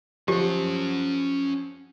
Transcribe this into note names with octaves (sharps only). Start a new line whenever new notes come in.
F3 C#4 G4 F#5